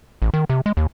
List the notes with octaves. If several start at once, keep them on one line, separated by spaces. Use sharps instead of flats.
A1
D#3
C3
G#3
D#2